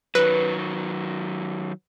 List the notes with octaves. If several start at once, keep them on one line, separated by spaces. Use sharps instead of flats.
D#3 F#3 B4